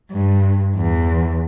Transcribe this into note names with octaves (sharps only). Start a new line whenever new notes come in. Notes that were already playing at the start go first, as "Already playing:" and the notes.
G2
E2